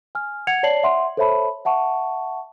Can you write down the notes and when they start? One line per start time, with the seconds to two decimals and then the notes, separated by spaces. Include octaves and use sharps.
0.15 G#5 F6
0.47 F#5 G#6 C#7 F7
0.63 C#5 D5 A5 C7 F#7
0.83 E5 F#5 C6
1.17 A4 C5 C#5 E5 A5 B5
1.65 E5 F#5 A5 C#6